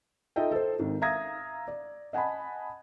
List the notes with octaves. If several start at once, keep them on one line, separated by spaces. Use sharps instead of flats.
D#4 F4 A4 D#5 E5 G5
A4 C5
G#1 D#3
E5 F5 A#5 D#6 G#6 A#6
D5
D#5 F#5 G#5 A5 B5